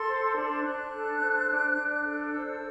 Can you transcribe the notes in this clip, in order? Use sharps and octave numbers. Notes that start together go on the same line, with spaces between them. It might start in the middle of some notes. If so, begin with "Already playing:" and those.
Already playing: A4 C6
C5
D4
D4 F#6
A4
C5
D4
D4
A4
C5 E6